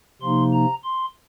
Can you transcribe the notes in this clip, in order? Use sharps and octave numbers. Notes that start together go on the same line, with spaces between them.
C3 F3 A#3 D#4 C6
A#5
C6